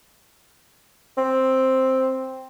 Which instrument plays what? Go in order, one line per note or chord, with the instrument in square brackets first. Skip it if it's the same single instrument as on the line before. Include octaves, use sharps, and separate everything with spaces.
[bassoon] C4